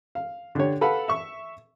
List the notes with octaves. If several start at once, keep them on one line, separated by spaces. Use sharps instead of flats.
F5
D3 D4 G4 C#5
A4 B4 F5 F#5 B5
E5 C#6